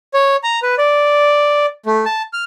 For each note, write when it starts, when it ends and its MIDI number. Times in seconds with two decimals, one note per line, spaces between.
0.14 0.36 73
0.43 0.60 82
0.62 0.75 71
0.78 1.66 74
1.86 2.05 57
2.05 2.22 81
2.33 2.44 89